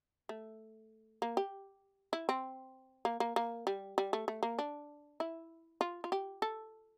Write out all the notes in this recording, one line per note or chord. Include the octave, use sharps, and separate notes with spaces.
A3
A#3
G4
E4
C4
A#3
A#3
A#3
G3
G3
A3
A3
A#3
D4
E4
F4
F4
G4
A4